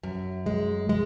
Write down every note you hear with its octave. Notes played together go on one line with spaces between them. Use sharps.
F#2
G#3
G#3